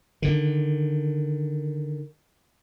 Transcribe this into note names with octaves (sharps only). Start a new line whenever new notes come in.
D3 D#3